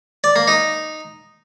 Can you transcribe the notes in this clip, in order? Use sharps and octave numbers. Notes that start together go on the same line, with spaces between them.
D5
A#3
D#4